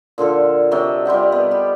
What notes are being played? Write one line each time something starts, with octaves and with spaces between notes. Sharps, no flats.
A#2 D3 F4 A4
C3 F#3 D5 D#5
G3 F4 G4 F#5
B3
G4